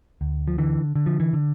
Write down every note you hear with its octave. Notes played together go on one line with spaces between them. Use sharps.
D2
F3
D3 E3
D3
F3
E3
D3